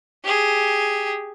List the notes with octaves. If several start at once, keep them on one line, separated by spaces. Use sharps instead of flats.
G4 G#4